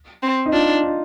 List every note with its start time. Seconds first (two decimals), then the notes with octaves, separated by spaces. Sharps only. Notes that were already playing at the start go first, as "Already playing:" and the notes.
0.23 C4
0.46 D#4
0.53 D4 F4
0.84 D#4